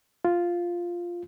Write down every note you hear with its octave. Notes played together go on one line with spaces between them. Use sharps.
F4